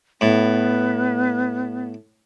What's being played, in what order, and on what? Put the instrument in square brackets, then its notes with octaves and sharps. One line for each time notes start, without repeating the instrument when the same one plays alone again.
[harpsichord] A2 [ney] B3